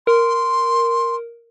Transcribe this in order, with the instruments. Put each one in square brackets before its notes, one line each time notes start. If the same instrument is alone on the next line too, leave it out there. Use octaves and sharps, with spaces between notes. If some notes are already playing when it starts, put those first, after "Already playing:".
[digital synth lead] A#4 [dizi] C6